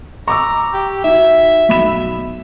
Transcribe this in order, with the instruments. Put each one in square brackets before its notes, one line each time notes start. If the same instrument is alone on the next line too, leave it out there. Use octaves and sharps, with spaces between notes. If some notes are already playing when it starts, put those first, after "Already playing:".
[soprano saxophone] A#5 [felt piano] C#6 D6 E6
[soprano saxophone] G4
[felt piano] D#4 F#4 [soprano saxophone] E5
[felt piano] B1 B5 E7